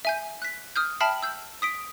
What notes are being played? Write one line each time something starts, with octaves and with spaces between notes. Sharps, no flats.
E5 G#5 G6
F#6 B6
D#6 F6 G6
E5 G5 A5 B5 F6 C7
E6 G6
D#6 B6 D7